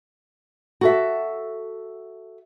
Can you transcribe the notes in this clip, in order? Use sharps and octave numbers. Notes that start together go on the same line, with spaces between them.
F#4 A4 E5